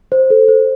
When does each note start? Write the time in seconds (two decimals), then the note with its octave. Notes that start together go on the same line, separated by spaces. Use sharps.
0.12 C5
0.30 A4
0.48 C5